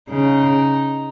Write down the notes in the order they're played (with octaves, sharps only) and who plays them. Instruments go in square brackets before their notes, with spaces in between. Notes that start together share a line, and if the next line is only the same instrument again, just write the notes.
[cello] C#3 [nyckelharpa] D#4